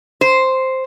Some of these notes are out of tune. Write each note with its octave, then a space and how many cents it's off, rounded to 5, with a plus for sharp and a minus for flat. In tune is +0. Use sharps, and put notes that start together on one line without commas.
C5 +0